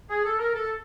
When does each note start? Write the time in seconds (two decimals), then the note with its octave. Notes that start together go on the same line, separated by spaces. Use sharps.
0.10 G#4
0.24 A4
0.39 A#4
0.54 A4